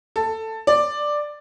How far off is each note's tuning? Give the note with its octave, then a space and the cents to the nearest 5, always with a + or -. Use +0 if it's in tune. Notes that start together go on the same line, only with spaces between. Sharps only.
A4 +10
D5 +5